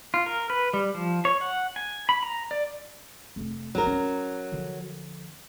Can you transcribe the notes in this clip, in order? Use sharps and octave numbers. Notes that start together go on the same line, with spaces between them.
F4
A#4
B4
G3
F3
C#5
F#5
G#5
B5
A#5
D5
F1 A3
G1 F#3 D4 A#4
C#4
D3 F3